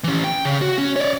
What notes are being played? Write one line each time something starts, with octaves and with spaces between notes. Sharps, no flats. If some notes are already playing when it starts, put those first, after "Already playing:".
E3 C#4
G5
C#3
F#4
C#4
C#5 D5